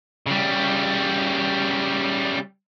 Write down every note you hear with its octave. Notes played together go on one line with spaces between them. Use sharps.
C#3 G3